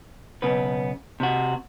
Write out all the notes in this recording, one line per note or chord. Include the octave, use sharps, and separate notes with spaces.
B1 C#3 B3 B4
C3 F#4